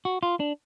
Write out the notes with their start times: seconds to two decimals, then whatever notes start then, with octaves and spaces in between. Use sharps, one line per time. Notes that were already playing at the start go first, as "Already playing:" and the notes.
0.05 F#4
0.23 F4
0.40 D4